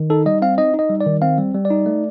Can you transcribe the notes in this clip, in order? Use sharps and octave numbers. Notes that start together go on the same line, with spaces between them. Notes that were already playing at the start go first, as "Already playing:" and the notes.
Already playing: D#3
D#4 A4
G3 D#5
C4 F5
D#4 D#5
D#4
D#5
G3
D5
D#3
C4 F5
G3
G3
D5
D#4
A3